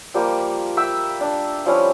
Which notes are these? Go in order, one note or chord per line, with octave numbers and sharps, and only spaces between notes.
F3 G3 A#3 G4
E5 G5 E6
D4
F3 G3 C#4 E4